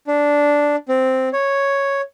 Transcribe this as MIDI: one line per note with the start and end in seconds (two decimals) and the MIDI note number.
0.07 0.76 62
0.89 1.29 60
1.33 2.01 73